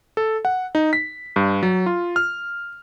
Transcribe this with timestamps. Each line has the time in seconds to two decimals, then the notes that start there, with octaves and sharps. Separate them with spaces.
0.17 A4
0.45 F#5
0.75 D#4
0.93 B6
1.36 G2
1.63 F#3
1.86 F4
2.16 F6